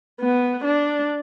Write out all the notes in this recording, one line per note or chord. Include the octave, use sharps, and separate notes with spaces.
B3
D4